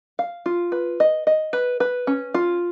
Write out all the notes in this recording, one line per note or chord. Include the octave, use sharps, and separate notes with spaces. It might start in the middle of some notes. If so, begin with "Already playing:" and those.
F5
F4
B4
D#5
D#5
B4
B4
C#4
F4